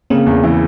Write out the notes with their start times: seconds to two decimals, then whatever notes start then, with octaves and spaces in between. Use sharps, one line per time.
0.10 C#3 A#3 C4
0.27 E2
0.43 E3